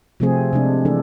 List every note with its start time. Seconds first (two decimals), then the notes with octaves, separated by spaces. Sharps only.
0.20 C3 F3 A3 C4 G#4
0.53 C3 G#3 D4
0.85 E3 G#3 D4 A4